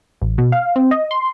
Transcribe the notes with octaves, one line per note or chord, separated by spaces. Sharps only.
A1
B2
F5
C4
D#5
C6